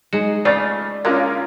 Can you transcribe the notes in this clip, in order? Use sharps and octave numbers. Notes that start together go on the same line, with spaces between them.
G#3 D#4 F#4
C#3 A3 F4 D5 A6
D3 G#3 A#3 C#4 F4 A#4